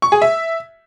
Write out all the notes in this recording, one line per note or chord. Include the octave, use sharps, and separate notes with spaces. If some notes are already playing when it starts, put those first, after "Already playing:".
C#6
G#4
E5